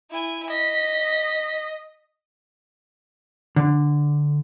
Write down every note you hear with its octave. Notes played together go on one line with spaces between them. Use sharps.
E4 G#5
D#5 B6
D3